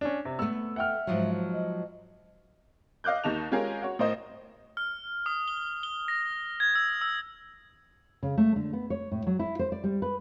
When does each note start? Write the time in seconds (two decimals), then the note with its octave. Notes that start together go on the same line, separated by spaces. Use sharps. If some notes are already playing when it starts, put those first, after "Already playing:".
0.01 C#4 D4
0.25 C3
0.39 A3 B3 E6
0.76 E5 F#5 G5 F6
1.07 G#2 F3 F#3
1.53 D#5
3.04 D#5 F5 D6 F#6 G6
3.24 D#2 D#3 D#4 A5 F7
3.51 G#3 C#4 F4 G4 G#4 A#4
3.82 F#4 C#5
3.99 A2 A#4 C5 D#5
4.77 F6
5.26 D#6
5.48 G7
5.83 G7
6.08 A#6
6.60 G#6
6.75 E6
7.01 E6
8.23 C#3
8.38 A3
8.56 D3
8.73 B3
8.90 C#5
9.11 A2
9.27 F#3
9.39 E4
9.59 C5
9.72 D5
9.84 G3
10.02 B4